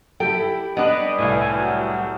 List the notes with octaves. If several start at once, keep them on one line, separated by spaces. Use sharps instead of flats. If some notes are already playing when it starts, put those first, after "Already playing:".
E4 G4 A4 G5
G3 B3 D4 B4 D#5
C2 A2 G#5
F#3